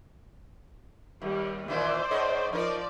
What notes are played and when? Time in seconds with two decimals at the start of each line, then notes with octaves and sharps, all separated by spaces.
1.22 D#2 G3
1.68 A#2 D#3 E3 C5 D5
2.11 G#2 C#5 D#5
2.53 F3 D#4 A#4 D5